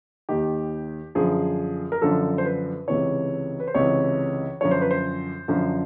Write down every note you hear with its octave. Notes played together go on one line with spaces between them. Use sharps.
D#2 D#3 G4
F#2 D3 F3 G#4
A#4
F#2 D3 F3 A4
C5
B4
C#2 C3 E3 C#5
B4
C5
C#2 C3 E3 C#5
F#2 D3 F3 C#5
C5
B4
C5
F#2 D3 F3